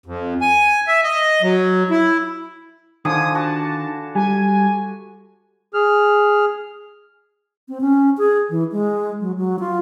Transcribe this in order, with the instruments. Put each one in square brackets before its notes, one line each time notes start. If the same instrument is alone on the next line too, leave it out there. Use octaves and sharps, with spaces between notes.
[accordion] F2
G#5
E5
D#5
F#3
E4
[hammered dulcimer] D3 F3 G#5 [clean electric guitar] D#3 [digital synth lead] D#6
[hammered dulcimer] F#4 [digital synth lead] A5
[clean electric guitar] G3 A5 [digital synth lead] G#5
[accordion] G#4 F6
[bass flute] C4
C#4
G#4
E3
G#3
F#3
F#3
F4